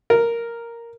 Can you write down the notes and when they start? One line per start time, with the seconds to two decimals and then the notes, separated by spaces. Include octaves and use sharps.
0.10 A#4